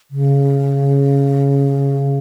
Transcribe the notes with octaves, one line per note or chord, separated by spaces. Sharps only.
C#3